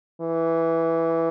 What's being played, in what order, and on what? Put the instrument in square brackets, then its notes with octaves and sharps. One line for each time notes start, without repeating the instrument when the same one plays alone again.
[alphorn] E3